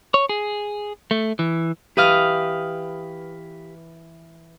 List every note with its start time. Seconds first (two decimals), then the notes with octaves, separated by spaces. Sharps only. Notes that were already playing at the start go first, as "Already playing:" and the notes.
0.14 C#5
0.29 G#4
1.11 A3
1.39 E3
1.97 E3 G4 B4 F5 D#6 F6